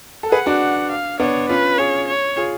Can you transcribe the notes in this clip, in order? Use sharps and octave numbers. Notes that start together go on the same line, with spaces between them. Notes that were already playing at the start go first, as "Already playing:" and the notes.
A4
G#4 B4 F#5
D4 F#4
F5
B3 D4 C#5
C#4 F4 B4
F4 G#4 C#5
C#5
F4 G#4